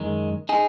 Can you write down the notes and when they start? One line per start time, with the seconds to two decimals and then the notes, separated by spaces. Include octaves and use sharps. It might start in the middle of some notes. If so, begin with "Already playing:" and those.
Already playing: F#2 D#3 G#3
0.49 D#4 G#4